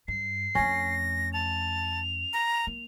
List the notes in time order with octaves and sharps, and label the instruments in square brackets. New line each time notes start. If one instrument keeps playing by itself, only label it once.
[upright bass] G2 [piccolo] C7
[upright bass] F2 A3 [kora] C#4 [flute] A#6
[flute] A5 [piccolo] F7
[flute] A#5
[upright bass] A#3